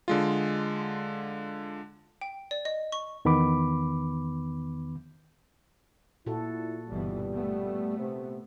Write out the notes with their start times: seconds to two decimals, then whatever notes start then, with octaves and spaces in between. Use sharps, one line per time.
0.08 D3 G#3 F4
2.21 G5
2.51 D5
2.65 D#5
2.92 C#6
3.25 E2 D#3 B3 B5 D6
6.26 A#2 E4 F#4 A4
6.89 G1 B2 E3 G3
7.33 A3 B3
7.98 C3